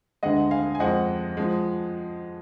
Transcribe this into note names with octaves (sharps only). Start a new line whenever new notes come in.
D2 D3 G#3 D#5 F#5
F5 G#5
G#5
F2 F3 G#3 D#5 F#5
F3 G#3